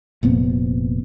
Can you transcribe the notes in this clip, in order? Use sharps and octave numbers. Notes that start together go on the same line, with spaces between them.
F1 A#2 B3 C4